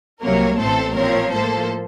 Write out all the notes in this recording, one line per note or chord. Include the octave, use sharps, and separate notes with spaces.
C2 C3 F#3 A#3 A#4 C#5
A1 A2 A3 C4 A4 C5
A#2 F3 C4 A#4 C#5
A2 F3 A#3 A4 C5